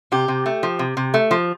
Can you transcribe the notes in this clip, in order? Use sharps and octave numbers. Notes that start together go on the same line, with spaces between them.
C3 G4
C3
A3
F3
C3
C3
A3
F3